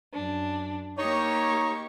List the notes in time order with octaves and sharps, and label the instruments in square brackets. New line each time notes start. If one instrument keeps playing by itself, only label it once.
[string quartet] F#2 D4
[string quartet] A#3 G4 C#6 [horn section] D#4 C#5